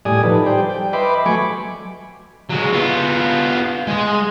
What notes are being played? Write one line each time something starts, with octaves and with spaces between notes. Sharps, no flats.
A2 G3 D5 G#5 D#6
F3 G3 D#4 A4 B4
G3 C5 D5 G5
G5
B4 D#5 E5 B5 C6 D6
F#3 A3 G#5 B5 C#6 D6
F#3 G#3
B3 F4
G#3 C6